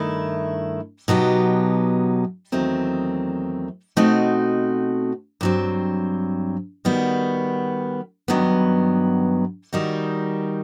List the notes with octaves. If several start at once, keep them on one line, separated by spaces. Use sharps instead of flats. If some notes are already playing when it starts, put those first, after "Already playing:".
Already playing: G2 D#3 A3 E4
B2 F#3 B3 D#4 G4
E2 D#3 F#3 A3 C4
B2 A3 C4 D#4 F#4
G2 F#3 C4
D#3 G3 B3 F#4
G2 D#3 F#3 B3
D#3 G3 D#4 F#4